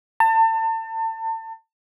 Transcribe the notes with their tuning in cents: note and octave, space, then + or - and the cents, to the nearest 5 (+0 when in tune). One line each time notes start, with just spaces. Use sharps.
A5 +35